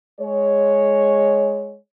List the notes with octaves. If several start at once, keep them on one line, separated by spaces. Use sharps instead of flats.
G#3 C#5